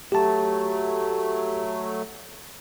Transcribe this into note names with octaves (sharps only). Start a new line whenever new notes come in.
F#3 A3 G4 A5